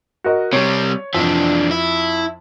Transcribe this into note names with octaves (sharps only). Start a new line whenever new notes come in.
F#4 A#4 D#5
C3 G3 C#5
F2 E3 D4
E4